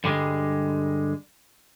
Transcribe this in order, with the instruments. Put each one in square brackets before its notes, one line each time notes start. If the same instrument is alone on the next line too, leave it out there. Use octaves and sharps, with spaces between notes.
[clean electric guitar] G2 D3 G3 G#3